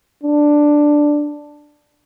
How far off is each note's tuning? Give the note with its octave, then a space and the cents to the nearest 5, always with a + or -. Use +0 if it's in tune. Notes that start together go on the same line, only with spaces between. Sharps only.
D4 +5